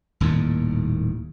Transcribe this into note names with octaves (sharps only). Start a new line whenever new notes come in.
D#1 D#2 A2